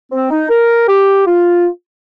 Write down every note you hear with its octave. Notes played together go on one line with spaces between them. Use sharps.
C4
D#4
A#4
G4
F4